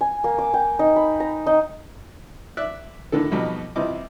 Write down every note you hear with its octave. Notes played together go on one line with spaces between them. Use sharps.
G#5
A#3
D6
G5
D#4
B5
A#5
D#4
D5 E5 F#6
A2 D3 D#3 A4
F2 B2 F#3 G3 D#4
C3 E3 F3 G3 D#5 D6